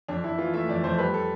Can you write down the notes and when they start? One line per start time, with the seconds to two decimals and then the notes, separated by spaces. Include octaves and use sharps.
0.08 F2 D4
0.24 F2 E4
0.38 E3 F4
0.53 A3 E5
0.69 F2 D5
0.84 F2 C5
0.98 G3 B4
1.14 A4